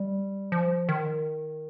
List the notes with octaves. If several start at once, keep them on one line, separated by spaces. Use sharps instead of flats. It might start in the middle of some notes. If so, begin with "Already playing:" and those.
Already playing: G3
F3
D#3